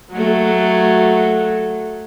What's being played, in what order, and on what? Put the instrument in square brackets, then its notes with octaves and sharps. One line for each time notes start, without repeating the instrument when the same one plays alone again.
[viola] F#3 A3